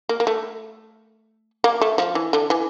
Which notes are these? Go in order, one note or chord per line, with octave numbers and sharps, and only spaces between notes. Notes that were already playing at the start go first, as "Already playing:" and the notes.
A#3
A#3
A3
A#3
A3
F3
E3
D3
E3